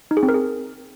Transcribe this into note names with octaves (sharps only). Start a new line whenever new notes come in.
D#4
G#4
C4
A#4
G#4